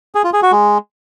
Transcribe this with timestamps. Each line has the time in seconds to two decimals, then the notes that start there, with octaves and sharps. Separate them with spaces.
0.15 G#4
0.24 F4
0.33 G#4
0.43 F#4
0.52 G#3